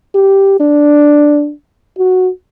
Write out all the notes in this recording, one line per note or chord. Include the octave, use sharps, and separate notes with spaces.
G4
D4
F#4